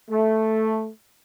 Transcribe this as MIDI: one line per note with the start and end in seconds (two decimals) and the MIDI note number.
0.10 0.89 57